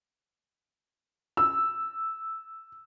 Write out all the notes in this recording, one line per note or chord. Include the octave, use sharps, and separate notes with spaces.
E6